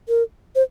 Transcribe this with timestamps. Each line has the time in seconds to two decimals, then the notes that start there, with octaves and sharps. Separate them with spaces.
0.09 A#4
0.55 C5